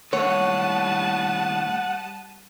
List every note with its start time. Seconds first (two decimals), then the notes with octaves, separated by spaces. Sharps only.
0.13 D#2 A2 G3 C#5 F#5 A5 D#6